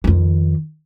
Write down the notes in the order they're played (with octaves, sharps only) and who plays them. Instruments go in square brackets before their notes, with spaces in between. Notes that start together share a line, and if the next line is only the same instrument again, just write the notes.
[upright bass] F2 D#3